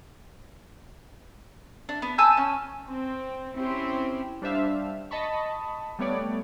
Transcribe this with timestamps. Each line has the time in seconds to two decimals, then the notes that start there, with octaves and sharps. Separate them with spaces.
1.89 D4
2.02 B3
2.18 G#5 A5 E6 G6
2.37 C#4
2.86 C4
3.56 C4 C#4 E4 G4
4.42 G3 D4 C5 E5 F5
5.11 D#5 A5 B5 C#6
5.99 G3 A3 B3 C#5 D5